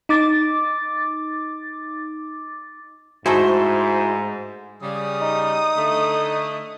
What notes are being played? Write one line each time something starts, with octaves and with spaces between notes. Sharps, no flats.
D#4 D6 A6
G#2 A3 D#4 E4 F#4 G#4 C5
C#3 G3 D#6
D#4
D3 A3